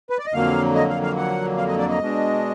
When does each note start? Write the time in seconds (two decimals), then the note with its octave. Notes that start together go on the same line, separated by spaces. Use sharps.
0.10 B4
0.19 D5
0.26 D#5
0.34 F2 D3 F#3 A#3 F5
0.75 D#5
0.89 F5
1.03 F5
1.17 F#5
1.57 F5
1.68 D#5
1.78 D5
1.89 D#5
2.00 B2 G#3 D4